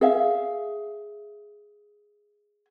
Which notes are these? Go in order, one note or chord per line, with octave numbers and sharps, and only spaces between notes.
G#4 E5 F5